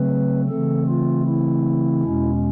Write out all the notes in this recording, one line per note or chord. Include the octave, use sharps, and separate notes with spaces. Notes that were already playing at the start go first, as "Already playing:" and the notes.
Already playing: C#3 F#3 A3 C4 B4
C#3 E3 A3 C4 A4
F4
E4
E2 B2 G#3 C#4